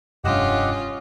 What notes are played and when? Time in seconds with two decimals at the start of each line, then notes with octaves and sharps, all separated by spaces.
0.24 F1 G2 C#4 F4 G4 D#5 F#5